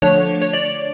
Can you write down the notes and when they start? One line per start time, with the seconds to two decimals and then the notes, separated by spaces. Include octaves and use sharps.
0.02 D3 F3 A3 D4 C#5
0.42 C#5
0.53 D5